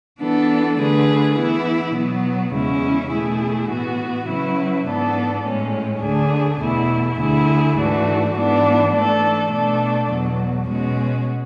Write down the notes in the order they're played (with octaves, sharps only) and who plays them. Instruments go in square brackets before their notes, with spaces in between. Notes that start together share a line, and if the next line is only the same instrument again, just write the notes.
[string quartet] E3 B3 D4 A4
D3 A3 D4 G#4 B4
E3 B3 E4
B2 F#3 B3
E2 C#3 G#3 C#4 E4
B2 A3 E4 G#4
A2 E3 B3 F#4
C#3 F#3 C#4 E4 B4
G#2 E3 B3 D4 A4
A2 G#3 C#4
D2 D3 A3 D4 G#4
E2 B2 A3 E4
D2 D3 A3 E4 G#4
G#2 E3 A3 D4 F#4
G#2 E3 B3 D4
E3 A3 D4 A4
B2 A3 D4 A4
E2 B2 F#3
B2 G#3 C#4 F#4